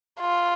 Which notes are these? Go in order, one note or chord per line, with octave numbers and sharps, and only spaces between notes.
F4